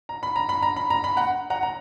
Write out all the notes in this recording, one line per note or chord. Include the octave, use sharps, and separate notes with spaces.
A#5
B5
A#5
B5
A#5
B5
A#5
B5
F#5 A#5
F#5 A#5
A#5